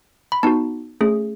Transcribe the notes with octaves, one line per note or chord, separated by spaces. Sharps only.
B5
B3 D#4 F#4 A5
A3 C#4 G#4